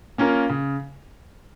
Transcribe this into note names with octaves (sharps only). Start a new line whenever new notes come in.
A#3 C#4 F4 A#4
C#3